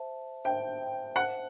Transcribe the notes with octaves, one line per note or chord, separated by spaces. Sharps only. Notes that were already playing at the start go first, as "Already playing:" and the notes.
Already playing: C5 E5 A5
C5 E5 G5 A5
C5 E5 F#5 A5